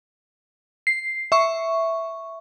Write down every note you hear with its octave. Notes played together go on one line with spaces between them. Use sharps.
C7
E5 C#6